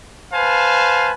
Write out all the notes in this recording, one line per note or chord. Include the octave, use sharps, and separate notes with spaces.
B4 C5 F5 G#5 A5